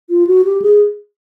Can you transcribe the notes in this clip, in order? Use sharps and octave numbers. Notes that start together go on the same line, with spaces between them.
F4
F#4
G4
G#4